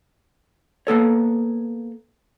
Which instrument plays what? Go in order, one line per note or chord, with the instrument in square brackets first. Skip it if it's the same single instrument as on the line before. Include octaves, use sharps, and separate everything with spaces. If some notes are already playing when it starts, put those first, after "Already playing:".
[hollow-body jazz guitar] A#3 B3 A4 C#5